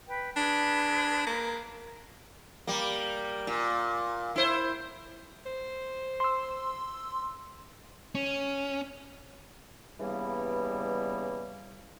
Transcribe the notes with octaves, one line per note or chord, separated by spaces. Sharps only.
B4 G5
D4 G#4 B4
A#3
G3 A#3
A#2
E4 C5
C5
C6 E6
C#4
G2 C#3 E3 G3 A#3 B3